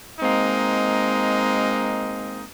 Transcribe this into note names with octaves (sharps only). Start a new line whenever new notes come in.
G#3 A#3 C4 D#4